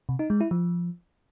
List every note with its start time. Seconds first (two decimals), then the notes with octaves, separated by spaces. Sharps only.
0.09 C3
0.19 D#4
0.30 G#3
0.41 E4
0.51 F3